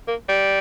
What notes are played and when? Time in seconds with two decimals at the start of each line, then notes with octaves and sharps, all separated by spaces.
0.08 A#3
0.28 G3